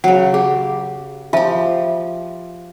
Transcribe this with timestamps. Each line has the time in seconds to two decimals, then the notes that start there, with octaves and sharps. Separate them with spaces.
0.04 C#3 F#3 F#5
0.34 G4 G#4
1.33 F3 F4 G4 E5 A5